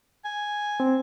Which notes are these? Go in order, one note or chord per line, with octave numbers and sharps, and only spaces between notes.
G#5
C4